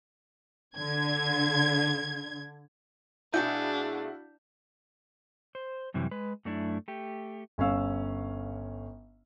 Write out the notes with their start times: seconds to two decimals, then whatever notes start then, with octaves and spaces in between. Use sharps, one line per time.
0.76 D3 G#6
3.34 B2 A3 D4 E4 F#4 G#4 F5 G6
5.55 C5
5.94 F#2 C3 E3 G3
6.11 G#3 B4
6.45 F#2 A3 D4 E4
6.88 A3 G4
7.58 G1 C#4 C#5 F5 E6